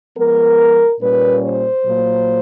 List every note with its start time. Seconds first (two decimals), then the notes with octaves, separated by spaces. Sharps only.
0.17 F3 G#3 B3 A#4
1.01 A#2 G3 A#3 C#4 B4
1.42 C5
1.85 A#2 F#3 A#3